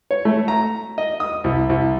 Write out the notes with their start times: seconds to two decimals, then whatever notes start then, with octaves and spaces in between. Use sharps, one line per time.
0.11 C#5
0.25 A3
0.48 A#5
0.98 D#5
1.20 D#6
1.44 C2
1.69 C2